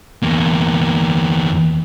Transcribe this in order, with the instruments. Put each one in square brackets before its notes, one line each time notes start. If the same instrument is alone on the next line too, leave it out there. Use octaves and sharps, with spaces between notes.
[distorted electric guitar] E2 A#3